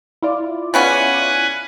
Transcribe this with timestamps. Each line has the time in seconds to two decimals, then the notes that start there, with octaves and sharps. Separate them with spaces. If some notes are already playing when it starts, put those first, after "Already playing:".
0.22 E4 F4 D5
0.74 C#3 B3 C#4 B4 F#5 G#5